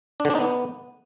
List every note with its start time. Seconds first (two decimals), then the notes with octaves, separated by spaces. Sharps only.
0.20 D4
0.25 D3
0.30 D4
0.35 D#4
0.40 B3